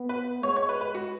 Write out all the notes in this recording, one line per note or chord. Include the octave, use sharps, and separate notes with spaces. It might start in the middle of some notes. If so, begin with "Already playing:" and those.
Already playing: B3
B4
G#3 C#5
C#5
B4
B4
F#4